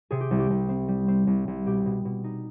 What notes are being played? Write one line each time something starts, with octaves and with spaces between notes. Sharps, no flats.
C3 G#4
G4
C2
G4
C2
C4
G3
C4
C2
C2
B2 G4
B2
B2
D#4